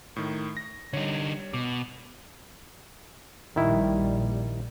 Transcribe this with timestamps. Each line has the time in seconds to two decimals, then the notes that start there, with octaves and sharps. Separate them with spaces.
0.16 A2 D#3
0.57 A#6
0.93 D3 G3 D#4 C#5
1.54 B2 D6
3.56 A#1 D#3 G3 E4